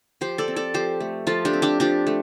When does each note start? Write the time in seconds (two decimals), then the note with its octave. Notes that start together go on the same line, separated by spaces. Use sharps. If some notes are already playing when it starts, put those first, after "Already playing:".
0.21 F3 G4 C5
0.38 A4 D5
0.48 C4
0.56 A4 D5
0.74 F3 G4 C5
1.00 A3
1.27 F3 F4 A4
1.45 D4 G4
1.53 C4
1.62 D4 G4
1.80 F3 D4 G4
2.07 A3